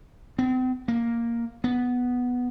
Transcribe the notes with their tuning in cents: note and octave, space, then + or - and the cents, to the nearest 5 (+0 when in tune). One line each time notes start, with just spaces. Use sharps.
C4 -40
A#3 +0
B3 +0